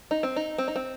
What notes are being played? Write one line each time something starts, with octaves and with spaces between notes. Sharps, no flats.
D#4
C4
D#4
C4
D#4
C4